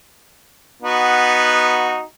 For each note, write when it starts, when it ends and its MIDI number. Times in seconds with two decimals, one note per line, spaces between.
0.82 2.02 59
0.82 2.02 63
0.82 2.02 66